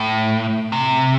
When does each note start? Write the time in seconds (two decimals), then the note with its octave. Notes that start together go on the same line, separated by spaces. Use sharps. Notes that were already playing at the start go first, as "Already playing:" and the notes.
Already playing: A2
0.72 C3